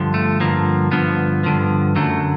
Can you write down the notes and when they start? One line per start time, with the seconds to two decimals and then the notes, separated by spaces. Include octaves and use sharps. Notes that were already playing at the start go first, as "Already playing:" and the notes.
Already playing: G2 D3 F3
0.14 A3
0.40 G2 D3 F3 A#3
0.91 G2 D3 F3 B3
1.44 G2 D3 F3
1.96 F#2 D3 F#3 A3